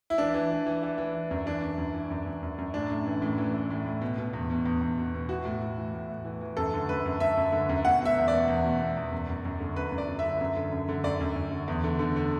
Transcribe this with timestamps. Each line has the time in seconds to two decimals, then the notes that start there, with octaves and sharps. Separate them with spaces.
0.10 E4
0.18 E3 D4
0.34 E3
0.51 E3
0.66 E3
0.83 E3
0.98 E3
1.14 E3
1.31 F#2
1.46 E3 D4
1.63 F#2
1.78 F#2
1.94 E3
2.10 F#2
2.26 F#2
2.42 F#2
2.58 F#2
2.74 A2 D4
2.90 A2
3.06 E3
3.22 A2
3.38 E3
3.54 E3
3.70 A2
3.86 A2
4.02 B2
4.18 B2
4.33 E2
4.50 B2
4.66 E2
4.81 E2
4.98 B2
5.14 B2
5.29 E3 F#4
5.45 A2
5.61 A2
5.78 E3
5.94 A2
6.09 A2
6.25 E3
6.41 E3
6.57 F#2 A4
6.74 D3
6.89 F#2 B4
7.06 F#2
7.20 F#2 E5
7.37 F#2
7.52 D3
7.69 F#2
7.85 B2 F#5
8.01 B2 E5
8.17 E2
8.28 B2 D5
8.48 E2
8.64 B2
8.80 B2
8.96 E2
9.12 F#2
9.29 F#2
9.45 F#2
9.60 D3
9.76 F#2 B4
9.92 F#2
9.98 D5
10.08 F#2
10.19 D3 E5
10.41 F#2
10.56 D3
10.72 F#2
10.89 D3
11.04 F#2 D5
11.20 F#2
11.36 F#2
11.51 D3
11.68 E2
11.84 D3
11.99 D3
12.16 D3